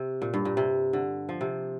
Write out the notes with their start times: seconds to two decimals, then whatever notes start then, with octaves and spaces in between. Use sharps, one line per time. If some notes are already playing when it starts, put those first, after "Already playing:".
Already playing: C3
0.22 A#2
0.34 G2
0.45 A#2
0.57 C3
0.93 D3
1.29 F3
1.41 C3